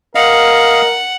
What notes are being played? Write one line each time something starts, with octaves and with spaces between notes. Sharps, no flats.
A#4 D#5 F5 F#5